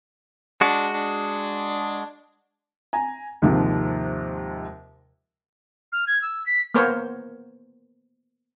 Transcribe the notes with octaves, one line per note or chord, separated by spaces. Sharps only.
G#3 D4 F#4
D4
G#5 A#5
D#2 G#2 C3 F3
F6
G#6
E6
B6
A#3 B3 A#4 C5 C#5